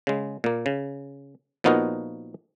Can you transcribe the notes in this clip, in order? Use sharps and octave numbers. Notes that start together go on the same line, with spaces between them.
C#3 G#3
A#2 A#3
C#3
A#2 F3 B3 D#4 F#4 A#4